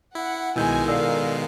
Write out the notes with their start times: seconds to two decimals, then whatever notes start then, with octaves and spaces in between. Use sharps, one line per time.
0.15 E4 F#5
0.56 B1 B2 D#3 G#3 E4 G#5 E6 G6
0.88 A4 A#4 D5 F5 E6